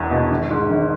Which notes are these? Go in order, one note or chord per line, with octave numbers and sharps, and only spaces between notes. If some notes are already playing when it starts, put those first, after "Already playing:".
Already playing: E1 E2 E4
B2
G#1
G#2
G#1